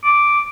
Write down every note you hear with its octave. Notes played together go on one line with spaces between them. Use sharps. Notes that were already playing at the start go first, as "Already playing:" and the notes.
D6